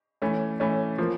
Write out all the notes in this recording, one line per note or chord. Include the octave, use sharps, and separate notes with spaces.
E3 A3 C#4
E3 A3 C#4
F3 A#3